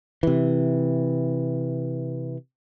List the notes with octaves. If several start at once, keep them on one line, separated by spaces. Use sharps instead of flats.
C3 E3